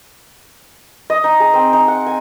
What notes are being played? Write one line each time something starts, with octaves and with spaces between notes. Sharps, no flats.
D#5
D#4
G#4
C4
D#4
F#5
G#5